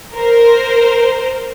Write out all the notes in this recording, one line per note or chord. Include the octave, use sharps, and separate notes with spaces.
A#4 C5